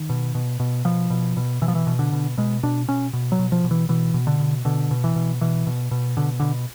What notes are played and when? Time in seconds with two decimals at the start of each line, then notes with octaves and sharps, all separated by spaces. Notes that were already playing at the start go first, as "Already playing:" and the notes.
Already playing: D#3
0.09 B2
0.35 B2
0.60 B2
0.85 B2 F3
1.10 B2
1.37 B2
1.62 B2 E3
1.68 F3
1.75 E3
1.87 B2
1.99 D3
2.12 B2
2.37 B2 G#3
2.63 B2 D4
2.88 B2 C#4
3.13 B2
3.32 F#3
3.39 B2
3.52 F3
3.64 B2
3.71 E3
3.89 B2 E3
4.14 B2
4.27 D3
4.40 B2
4.65 B2 D3
4.91 B2
5.04 E3
5.16 B2
5.41 B2 E3
5.67 B2
5.91 B2
6.17 B2 D3
6.40 B2 D3